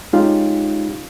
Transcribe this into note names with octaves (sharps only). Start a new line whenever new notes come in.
G#3 C#4 D#4 F4 G4 F5